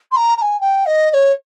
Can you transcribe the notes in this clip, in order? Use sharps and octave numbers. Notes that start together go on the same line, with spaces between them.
C6
A#5
A#5
G#5
G5
D#5
D#5
C#5